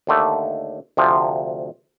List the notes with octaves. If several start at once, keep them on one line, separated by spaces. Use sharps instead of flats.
D#2 D3 A3
D2 C3 F3